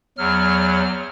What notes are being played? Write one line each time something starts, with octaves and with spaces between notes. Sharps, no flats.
E2 F#3 F6